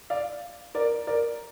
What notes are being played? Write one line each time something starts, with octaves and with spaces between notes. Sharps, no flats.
D5 F5
A#4 D5
A#4 D5